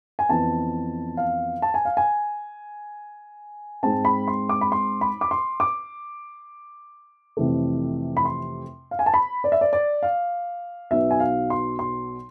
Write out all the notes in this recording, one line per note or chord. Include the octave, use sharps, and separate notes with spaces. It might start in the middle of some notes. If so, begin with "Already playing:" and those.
G#5
F2 E3 B3 A5
F5
A5
G#5
F5
G#5
G#2 G#3 C4 A5
B5
C6
D6
B5
C6
B5
D6
C6
D6
F2 C3 E3 A3
B5
C6
F5
G#5
A5
B5
D5
E5
D5
D5
F5
B1 B2 B3 E5
G#5
F5
C6
C6